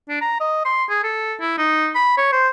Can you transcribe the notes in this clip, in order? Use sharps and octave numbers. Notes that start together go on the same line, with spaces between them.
D4
A#5
D#5
C6
G#4
A4
E4
D#4
B5
C#5
C5